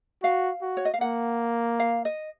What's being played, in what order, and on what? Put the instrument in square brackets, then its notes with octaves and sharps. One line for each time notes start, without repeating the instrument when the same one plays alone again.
[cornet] F#4 [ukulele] F5
[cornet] F#4
[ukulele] C#5
D#5
F5
[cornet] A#3 [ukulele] F#5
[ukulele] F5
D#5